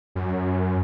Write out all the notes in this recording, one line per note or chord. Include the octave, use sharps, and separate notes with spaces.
F#2